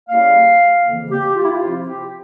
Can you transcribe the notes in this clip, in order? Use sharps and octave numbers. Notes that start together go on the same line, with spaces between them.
C#3 G3 A#3 E4 F5
F2 C#3 E3 A#3
G4
F4
E4
F4
C3 F3 C4 E4 F4
F4
G4